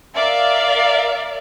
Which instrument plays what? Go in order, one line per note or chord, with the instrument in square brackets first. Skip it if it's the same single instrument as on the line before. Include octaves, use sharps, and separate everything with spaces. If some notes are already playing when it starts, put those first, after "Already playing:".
[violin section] A#4 D5 E5 F5